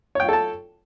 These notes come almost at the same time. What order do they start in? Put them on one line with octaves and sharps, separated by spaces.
C#5 G5 F4 A4 A5